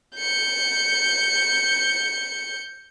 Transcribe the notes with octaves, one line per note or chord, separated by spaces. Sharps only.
G6 C#7